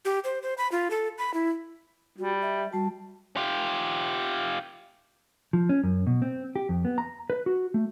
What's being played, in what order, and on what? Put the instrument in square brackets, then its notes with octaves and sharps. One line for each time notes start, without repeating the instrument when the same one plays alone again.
[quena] G4
C5
C5
B5
F4
A4
B5
E4
[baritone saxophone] G3 [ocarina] F#4
[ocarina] E5
[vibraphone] G3 A5 [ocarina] F#4
[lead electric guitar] F4 G4
[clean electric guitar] F3
C#4
F#2
B2
C4
G4
F2
B3
A#5
B4
F#4
A3